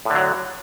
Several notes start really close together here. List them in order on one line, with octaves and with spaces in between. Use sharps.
A2 D3 F#3